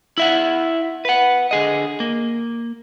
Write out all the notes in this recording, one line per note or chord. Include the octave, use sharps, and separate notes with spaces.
E4 E5 F#5
B4 F#5
D3 G#4 D#5
A#3